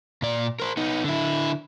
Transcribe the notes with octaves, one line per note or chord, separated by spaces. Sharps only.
A#2 D5
A#4 C5
B3 D#4
D3 E4